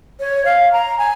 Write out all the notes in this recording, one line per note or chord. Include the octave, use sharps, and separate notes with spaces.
C#5
F5
A#5
G#5